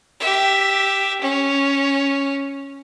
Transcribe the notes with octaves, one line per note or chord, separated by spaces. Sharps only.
G4 E5
C#4